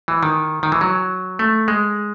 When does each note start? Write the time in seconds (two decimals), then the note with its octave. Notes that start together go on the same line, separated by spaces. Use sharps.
0.08 E3
0.23 D#3
0.63 D#3
0.72 E3
0.81 F#3
1.39 A3
1.68 G#3